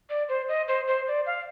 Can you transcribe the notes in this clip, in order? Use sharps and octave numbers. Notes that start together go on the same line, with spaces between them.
D5
C5
D#5
C5
C5
D5
F5